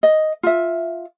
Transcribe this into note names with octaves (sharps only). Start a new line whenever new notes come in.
D#5
F4 E5